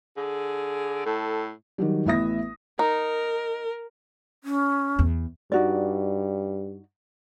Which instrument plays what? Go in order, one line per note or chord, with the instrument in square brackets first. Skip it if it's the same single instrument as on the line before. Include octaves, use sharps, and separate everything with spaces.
[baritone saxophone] D3 [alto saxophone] G#4
[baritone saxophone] A2 [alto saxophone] A4
[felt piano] D#3 F#3 G3
A1 B3 E4 E5 D#6 A#6
[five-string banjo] D#4 [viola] A#4
[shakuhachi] C#4
[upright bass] E2
[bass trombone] G2 [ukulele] D#4 F#4 D5